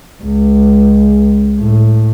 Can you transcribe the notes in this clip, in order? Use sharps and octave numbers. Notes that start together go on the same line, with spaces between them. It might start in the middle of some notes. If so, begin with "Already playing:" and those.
C#2
A2